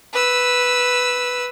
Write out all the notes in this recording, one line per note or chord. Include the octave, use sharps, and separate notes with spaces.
B4 E6